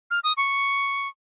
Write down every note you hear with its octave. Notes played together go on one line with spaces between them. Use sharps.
F6
D#6
C#6